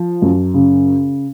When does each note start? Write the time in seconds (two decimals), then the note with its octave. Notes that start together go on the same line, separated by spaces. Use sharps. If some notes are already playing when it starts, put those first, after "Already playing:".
Already playing: F3
0.22 F#2
0.54 C#3